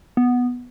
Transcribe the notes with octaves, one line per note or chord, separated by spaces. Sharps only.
B3